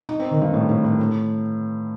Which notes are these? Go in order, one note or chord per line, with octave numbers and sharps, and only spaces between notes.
D#4
C4
D#3
G2
A2
A2
A2
A2